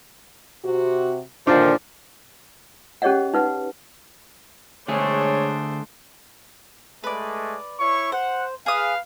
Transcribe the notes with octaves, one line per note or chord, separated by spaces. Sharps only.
C3 F#4
A#2 D3 D#3 F3 D4
C#4 G4 G#4 C#5 D#5 F#5
D#4 B4 F#5
D3 G#3 A3 D4 G#4 C5 C#5
G#3 A3 B4 D5
E4 C#5 C#6
C5 F#5
G#4 B4 F5 D#6